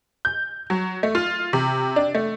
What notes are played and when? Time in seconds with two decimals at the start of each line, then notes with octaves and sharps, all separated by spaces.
0.25 G6
0.70 F#3
1.03 A3
1.15 F4
1.53 C3
1.96 D4
2.15 A3